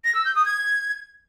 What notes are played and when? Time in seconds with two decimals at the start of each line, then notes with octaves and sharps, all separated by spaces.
0.04 A#6
0.15 E6
0.25 G6
0.35 D#6
0.46 G#6